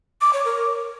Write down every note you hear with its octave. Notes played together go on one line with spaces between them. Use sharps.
D6
C#5
A#4